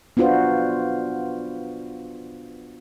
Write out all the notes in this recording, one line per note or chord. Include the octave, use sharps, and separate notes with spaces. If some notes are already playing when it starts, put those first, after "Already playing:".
B3 D4 F4 F#4 C5